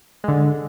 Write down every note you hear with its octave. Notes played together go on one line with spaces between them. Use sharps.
D3 G#3